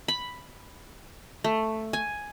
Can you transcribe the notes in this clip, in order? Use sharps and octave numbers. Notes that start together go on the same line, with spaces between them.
B5
A3
G#5